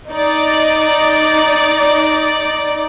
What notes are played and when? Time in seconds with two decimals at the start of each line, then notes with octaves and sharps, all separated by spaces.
0.11 D#4 D5